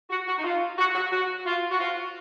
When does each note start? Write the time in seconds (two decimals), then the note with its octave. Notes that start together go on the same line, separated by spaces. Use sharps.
0.10 F#4
0.27 F#4
0.38 D#4
0.44 F4
0.78 F#4
0.95 F#4
1.12 F#4
1.46 F4
1.71 F#4
1.79 F4